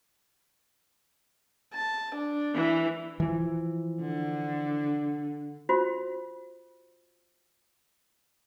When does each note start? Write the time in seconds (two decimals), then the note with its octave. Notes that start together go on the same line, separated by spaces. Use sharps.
1.74 A5
2.15 D4
2.55 E3
3.20 E3 F3
4.01 D3
5.69 F4 F#4 C5